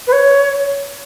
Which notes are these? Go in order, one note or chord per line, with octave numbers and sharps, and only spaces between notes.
B4
C#5